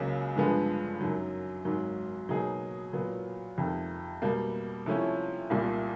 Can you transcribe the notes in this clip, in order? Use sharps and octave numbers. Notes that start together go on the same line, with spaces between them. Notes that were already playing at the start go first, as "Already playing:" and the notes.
Already playing: C#2 C#3 F#3 A#3
G2 D3 F3 G#3 B3
F#2 D#3 F#3
G#1 G#2 D#3 F#3
B2 F#3 A#3 D#4 G#4
A#2 F#3 B3
F2 C3 D#3
B2 G3 A#3
C3 F3 A3 C#4 E4
C2 A#2 G3